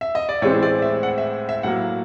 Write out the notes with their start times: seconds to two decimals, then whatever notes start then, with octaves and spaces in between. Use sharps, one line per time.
0.01 E5
0.15 D#5
0.29 D5
0.42 A2 E3 G#3 C4 C#5
0.63 D5
0.82 E5
1.03 F#5
1.18 E5
1.49 E5
1.63 A2 F#3 A#3 F#5